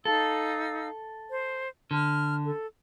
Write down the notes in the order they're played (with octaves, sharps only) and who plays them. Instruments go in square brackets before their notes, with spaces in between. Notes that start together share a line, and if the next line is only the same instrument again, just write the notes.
[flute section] D#4 F5 E6 [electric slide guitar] A4
[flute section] C5
[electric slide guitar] D3 [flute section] F6
[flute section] A4